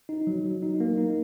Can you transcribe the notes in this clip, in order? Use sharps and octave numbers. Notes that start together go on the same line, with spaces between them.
D#4
F#3
F#3
D#4
A#3
D#4